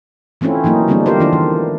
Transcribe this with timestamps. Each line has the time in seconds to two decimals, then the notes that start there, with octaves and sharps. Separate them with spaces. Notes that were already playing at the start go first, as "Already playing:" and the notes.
0.41 E3 A3 C4 C#4 E4 F4
0.64 E3 F#3 A#3 D#4
0.88 D3 G3 G#3 B3 C4 D4
1.06 F4 G4 A#4 C5
1.20 D#3 E3 D4 F4
1.33 D#3 E3